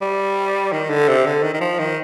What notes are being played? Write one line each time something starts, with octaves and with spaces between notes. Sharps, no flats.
G3
D#3
D3
C3
D3
D#3
D#3
F3
D#3